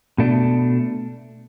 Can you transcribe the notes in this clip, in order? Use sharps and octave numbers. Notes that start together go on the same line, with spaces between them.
B2 A3 D4